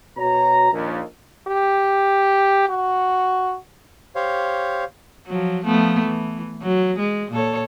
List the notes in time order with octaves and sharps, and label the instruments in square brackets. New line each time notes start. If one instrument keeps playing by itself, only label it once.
[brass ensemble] B2 F#4 C#5 A#5
A#1 D#2
[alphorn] G4
F#4
[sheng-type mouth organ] G4 C5 C#5 F5
[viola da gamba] F3 F#3
F3 A3 B3
E3
F#3
G#3
A#2 A4 C#5